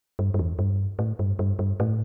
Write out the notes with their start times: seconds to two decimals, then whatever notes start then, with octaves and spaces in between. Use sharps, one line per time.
0.19 G2
0.34 G2
0.39 E2
0.59 G2
0.99 A2
1.19 G2
1.39 G2
1.59 G2
1.80 A2